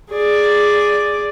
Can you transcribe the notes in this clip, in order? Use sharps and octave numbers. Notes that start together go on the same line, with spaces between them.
G#4 D5